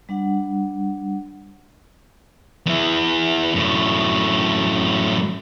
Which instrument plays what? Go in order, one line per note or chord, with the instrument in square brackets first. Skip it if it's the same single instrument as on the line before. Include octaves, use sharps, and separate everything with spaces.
[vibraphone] G3 D4 F#5
[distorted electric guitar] E2 E3
F#2 A2